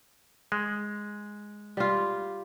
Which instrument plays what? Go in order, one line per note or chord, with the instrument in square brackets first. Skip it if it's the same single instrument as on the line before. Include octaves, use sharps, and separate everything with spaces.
[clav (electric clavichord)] G#3
[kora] G3 F4